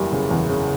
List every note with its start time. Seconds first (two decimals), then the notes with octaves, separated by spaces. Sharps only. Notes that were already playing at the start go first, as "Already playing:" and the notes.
Already playing: F#1 E2 G3
0.12 C#3
0.31 E2
0.49 C#3